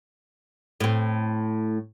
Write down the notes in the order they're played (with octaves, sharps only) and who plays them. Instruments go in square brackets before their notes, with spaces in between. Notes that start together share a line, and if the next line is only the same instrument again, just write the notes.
[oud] A2 C4